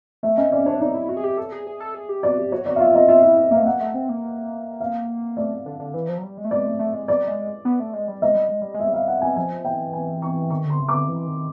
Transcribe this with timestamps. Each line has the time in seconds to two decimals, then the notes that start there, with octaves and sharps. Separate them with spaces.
0.23 A3 E5
0.37 C#4 D#5
0.52 C#4 D5
0.66 D4 C#5
0.80 D#4 D5
0.94 E4
1.09 F#4
1.17 G#4
1.24 G4
1.37 A4
1.52 G#4
1.67 G#4
1.80 A4
1.95 G#4
2.09 G4
2.23 F#4 D5
2.38 G4
2.52 F#4 C#5
2.66 F#4 D5
2.76 F5
2.80 F4 E5
2.95 D#5
3.08 F4 E5
3.23 E4 E5
3.51 A#3 F5
3.60 A3
3.66 A#3 F#5
3.80 A3
3.94 C4
4.09 A#3
4.80 F5
5.37 A3 D5
5.66 D3
5.79 D3
5.94 E3
6.08 F3
6.18 F#3
6.23 G3
6.37 G#3
6.44 A3
6.50 G#3 D5
6.65 A3
6.79 A3
6.94 G#3
7.08 G3 D5
7.28 G#3
7.65 B3
7.80 A3
7.93 G#3
8.08 G3
8.21 G#3 D#5
8.34 G3
8.48 G#3
8.61 G3
8.74 G#3 E5
8.88 G3
8.94 F5
9.08 F#5
9.21 G#5
9.36 F3 G#5
9.65 E3 G5
9.93 G#5
10.22 C#6
10.50 D#3 C#6
10.65 D3 C6
10.80 C#3
10.89 D6
10.94 D3
11.08 E3
11.27 D#3